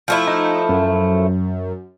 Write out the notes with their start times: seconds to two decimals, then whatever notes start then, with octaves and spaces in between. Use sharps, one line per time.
0.08 F3 A3 E4
0.27 D#4
0.69 F#2